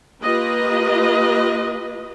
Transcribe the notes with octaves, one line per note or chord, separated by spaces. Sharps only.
A#3 F4 G4 B4 D#5